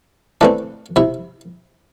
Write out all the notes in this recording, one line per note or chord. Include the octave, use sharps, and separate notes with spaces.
E3 A3 C4 D4
C3 E4